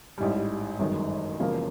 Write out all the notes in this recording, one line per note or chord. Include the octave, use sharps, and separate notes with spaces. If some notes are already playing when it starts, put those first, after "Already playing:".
A1 G#2 E3 G3
G1 F#2 D#3 G#3
E1 E2 C#3 F3 A#3